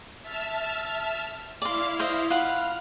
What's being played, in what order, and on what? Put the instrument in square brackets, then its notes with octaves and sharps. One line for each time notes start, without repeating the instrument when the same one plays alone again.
[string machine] E5 A5 F6
[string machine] E4 F5 [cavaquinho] D5 C6
[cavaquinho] C5 D#5 E5
[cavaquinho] F4 F#5 B5 [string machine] F6